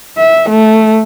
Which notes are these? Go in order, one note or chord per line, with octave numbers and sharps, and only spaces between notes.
E5
A3